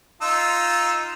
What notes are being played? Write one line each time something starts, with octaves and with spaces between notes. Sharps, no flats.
D#4 F4 E6